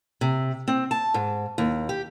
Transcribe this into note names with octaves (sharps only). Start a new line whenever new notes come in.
C3
C4
A5
G#2
D#2
G4